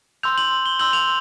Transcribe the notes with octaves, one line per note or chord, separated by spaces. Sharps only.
C6 E6 G6 F7
F#7
G7
C6 E6 G6 F#7
F7